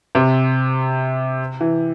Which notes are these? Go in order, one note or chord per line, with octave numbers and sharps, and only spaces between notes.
C3
E3